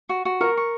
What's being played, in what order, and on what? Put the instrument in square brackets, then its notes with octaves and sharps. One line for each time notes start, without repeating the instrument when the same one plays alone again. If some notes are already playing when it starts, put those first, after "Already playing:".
[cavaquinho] F#4
F#4
[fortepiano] A#4 [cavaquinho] C#6
[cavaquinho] C#6